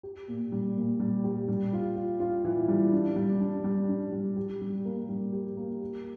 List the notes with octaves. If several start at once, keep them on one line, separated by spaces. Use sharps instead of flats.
G4
A#2
G3
A#2
G3
G4
G3
F4
F4
F4
E3
G3
D4
G3
D4
G3
D4
G3
G4
G3
A#3
G3
G4
A#3
G4